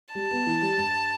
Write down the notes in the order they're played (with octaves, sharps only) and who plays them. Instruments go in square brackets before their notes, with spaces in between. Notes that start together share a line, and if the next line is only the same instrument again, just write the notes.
[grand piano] G3 [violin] A5
[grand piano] B3
E3
G3
G2